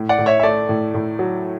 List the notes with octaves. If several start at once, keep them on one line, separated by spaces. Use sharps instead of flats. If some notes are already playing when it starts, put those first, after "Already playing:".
Already playing: A2
D5 F#5
A2
C#5 E5
E5
A3 D5
A2
A2
F#3